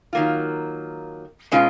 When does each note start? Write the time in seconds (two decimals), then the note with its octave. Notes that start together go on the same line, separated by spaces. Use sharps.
0.13 D#3 F#3 A#3 F4
1.52 B2 G#3 C#4 F4